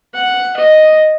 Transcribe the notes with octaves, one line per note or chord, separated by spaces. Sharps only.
F#5
D#5